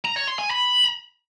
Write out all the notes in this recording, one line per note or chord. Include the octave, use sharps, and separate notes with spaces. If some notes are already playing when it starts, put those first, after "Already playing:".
A#5
C#5
C6
G#5
B5